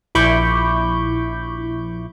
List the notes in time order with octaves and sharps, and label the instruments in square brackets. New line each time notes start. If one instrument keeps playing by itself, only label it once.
[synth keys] A#1 E4 B5 C#6 D6 G6